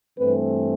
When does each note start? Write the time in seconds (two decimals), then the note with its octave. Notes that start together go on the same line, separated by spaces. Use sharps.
0.17 G2 E3 A3 C4 B4